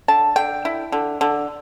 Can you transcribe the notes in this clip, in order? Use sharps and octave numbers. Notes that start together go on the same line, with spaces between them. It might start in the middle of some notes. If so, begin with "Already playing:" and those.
D3 A5
D3 G5
E4
D3
D3